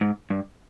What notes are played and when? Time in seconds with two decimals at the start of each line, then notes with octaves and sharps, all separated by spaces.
0.01 G#2
0.30 G2